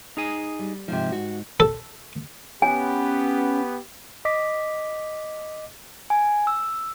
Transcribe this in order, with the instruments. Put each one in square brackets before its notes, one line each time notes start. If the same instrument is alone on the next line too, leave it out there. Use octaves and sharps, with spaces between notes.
[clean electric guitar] D#4 G#4 G#5
[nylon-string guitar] G3
[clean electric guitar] G#2 [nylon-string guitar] C3 F3
[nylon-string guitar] F#4
[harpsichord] A4
[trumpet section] B3 [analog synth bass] C#4 [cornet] G4 [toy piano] G#5
[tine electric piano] D#5 D6 B6
[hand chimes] G#5
E6